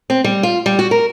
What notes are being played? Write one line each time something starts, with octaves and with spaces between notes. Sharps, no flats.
C4
G3
F4
G3
F#4
A#4